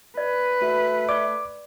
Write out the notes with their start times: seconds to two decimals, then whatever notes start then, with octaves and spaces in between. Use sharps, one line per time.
0.17 B4 D5
0.62 A3 F#4
1.09 D5 C#6 D6